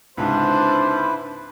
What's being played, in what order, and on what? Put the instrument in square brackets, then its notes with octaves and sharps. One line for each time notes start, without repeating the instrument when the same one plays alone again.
[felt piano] C#2 G#2 C3 [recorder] D4 [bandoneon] E4 B4 B5 [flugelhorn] C5